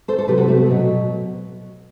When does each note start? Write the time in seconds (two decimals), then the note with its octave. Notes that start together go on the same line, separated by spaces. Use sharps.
0.08 A4 C5
0.18 A4
0.28 C3 F#3 G4 B4
0.37 F#4 A4
0.48 A3 C4
0.57 B3
0.66 B2 F#3